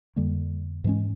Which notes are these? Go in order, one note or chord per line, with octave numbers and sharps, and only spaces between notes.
F2 D3 G3 A#3
G#2 E3 G#3 C#4